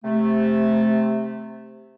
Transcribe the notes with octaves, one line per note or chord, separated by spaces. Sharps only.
C3 A3